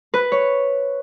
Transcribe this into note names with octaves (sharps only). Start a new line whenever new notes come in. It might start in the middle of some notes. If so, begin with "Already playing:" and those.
B4
C#5